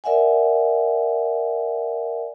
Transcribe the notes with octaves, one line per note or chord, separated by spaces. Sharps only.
A#4 D5 E5 F#5 G#5